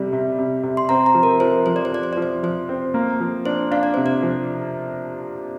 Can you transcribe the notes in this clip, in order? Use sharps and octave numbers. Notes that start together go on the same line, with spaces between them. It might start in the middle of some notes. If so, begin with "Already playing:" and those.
Already playing: C3 G3
C3
C3
C3
C6
C4 A#5
A#5
F3
A#4
F3 C5
F3 C5
D5
C5
F3 D5
C5
D5
F3
C5
F3 C5
C4
A#3
F3
D4 C5
D4 F5
D5
C3 C5
D5
F3